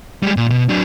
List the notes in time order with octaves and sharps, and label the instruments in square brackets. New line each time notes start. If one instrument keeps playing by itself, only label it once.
[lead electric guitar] G3 G#3
A#2
B2
F#3 D4